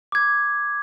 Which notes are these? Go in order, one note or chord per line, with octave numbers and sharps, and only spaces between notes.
D6 G#6